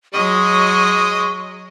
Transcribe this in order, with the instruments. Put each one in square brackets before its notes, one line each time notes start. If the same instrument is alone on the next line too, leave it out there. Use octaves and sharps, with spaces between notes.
[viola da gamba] F#3 [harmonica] G#3 [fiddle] D#5 D#6 [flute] C#6